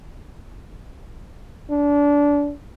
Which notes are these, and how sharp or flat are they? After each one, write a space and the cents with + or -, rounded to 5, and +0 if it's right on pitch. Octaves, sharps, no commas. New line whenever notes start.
D4 -25